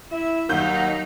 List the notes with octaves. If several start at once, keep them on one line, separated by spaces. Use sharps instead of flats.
E4 E5
D#2 F#3 D#4 A#4 F#5 G6